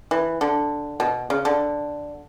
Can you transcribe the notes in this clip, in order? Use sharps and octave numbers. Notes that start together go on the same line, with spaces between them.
E3
D3
B2
C#3
D3